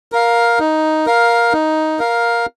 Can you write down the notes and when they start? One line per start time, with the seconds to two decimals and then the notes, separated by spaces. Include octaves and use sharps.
0.12 A#4 F5
0.59 D#4
1.06 A#4 F5
1.53 D#4
1.99 A#4 F5